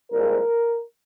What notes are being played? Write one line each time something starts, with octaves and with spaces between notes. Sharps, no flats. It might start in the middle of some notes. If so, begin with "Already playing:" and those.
C2 A#2 F3 G#3 A#4